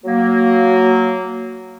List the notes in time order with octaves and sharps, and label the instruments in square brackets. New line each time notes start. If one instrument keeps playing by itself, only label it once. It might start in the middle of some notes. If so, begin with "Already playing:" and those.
[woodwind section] F#3 A#3